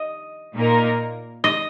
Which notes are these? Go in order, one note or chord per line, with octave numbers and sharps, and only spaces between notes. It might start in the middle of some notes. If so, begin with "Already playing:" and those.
Already playing: D#5
A#2 A#3 D#4 A#4
D#5